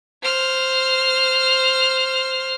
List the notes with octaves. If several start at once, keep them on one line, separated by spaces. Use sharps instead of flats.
C5 F6